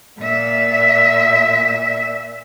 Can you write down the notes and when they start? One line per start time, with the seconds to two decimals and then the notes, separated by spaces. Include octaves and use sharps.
0.20 A#2 E5